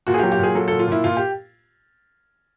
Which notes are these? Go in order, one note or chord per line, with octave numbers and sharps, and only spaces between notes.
A#2 F#4
G#4
G4
F#3
G4
A#2 G#4
F#3 A4
A#2 A4
F4
A#2 E4
A#2 F4
G4